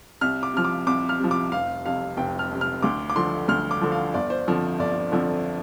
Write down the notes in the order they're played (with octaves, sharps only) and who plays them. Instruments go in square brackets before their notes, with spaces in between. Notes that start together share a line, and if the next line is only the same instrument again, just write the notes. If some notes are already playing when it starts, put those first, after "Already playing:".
[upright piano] C2 F6
D6
C3 F3 F6
D6
C2 D6
F6
C3 F3
D6
F1 F5
F2 C3 F5
F1 G5
F6
F2 C3
F6
D2 D6
D6
D3 F3 C6
D2 F6
D6
D3 F3
F5
G1 D5
C5
F2 D3 F3
G1 D5
F2 D3 F3